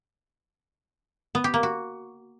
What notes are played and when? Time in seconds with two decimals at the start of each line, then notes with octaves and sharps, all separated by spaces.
1.35 B3
1.44 G4
1.54 A#3
1.63 F#4